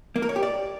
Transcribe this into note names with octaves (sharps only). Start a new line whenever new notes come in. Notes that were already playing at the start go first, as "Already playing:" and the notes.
A#3
A#4
C#5
G4
D5